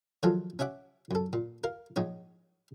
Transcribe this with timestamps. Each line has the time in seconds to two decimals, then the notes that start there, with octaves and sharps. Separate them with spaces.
0.23 D#3 F3 F#3 G#3 F4 A4
0.59 C#4 C#5 E5 F#5 D6
1.11 F#2 A4
1.33 A#2
1.64 A#4 F5
1.96 A#1 G#2 D#4 C#5